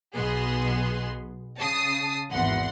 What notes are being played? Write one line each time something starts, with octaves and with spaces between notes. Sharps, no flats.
B1 B2 B3 G#4 C6
C#3 A5 D#6 C7
G#1 E2 F#5 C6